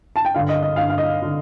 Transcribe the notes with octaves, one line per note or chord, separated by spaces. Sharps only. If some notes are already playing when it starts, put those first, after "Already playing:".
A5
G5
G2 D3 F5
D#5
D#5
G2 D3 F5
F5
D#5
D3